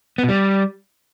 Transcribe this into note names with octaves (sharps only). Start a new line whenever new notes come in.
B3
B2
G3